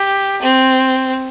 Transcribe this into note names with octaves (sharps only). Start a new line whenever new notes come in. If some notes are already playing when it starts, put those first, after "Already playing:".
Already playing: G4
C4